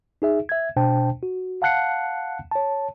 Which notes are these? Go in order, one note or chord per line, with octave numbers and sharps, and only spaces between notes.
D#4 G#4 E5
E5 G#6
B2 D4 C5 G5 A5
F#4
F5 F#5 A5 F#6 C7 C#7
C#5 A5